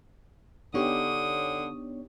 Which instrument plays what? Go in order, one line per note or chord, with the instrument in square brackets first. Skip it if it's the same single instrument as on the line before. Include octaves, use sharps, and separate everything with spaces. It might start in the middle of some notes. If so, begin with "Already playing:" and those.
[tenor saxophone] D3 [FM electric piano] B3 D4 C#5 [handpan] D#4 G4 [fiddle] D#6